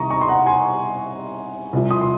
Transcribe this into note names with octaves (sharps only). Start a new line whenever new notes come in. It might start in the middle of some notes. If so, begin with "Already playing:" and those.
Already playing: C2 C3 D#3 A#5 C#6 D#6
A#5 C#6
C6
F#5 A#5
G#5 C6
C2 C3 F3
C6 D#6
C6